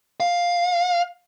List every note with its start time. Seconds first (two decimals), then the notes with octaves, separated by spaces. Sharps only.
0.20 F5